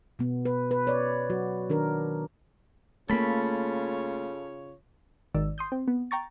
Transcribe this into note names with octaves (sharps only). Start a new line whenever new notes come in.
B2 B3
B4
B4
C#5 D5
F#3 F#4
D#3 D4 A#4
C#3 A3 A#3 F4 A4 C#5 B5
G#1 D#3 D5 E6
C6 D#6 G6
C4
B3
G5 A#5 C#6 A6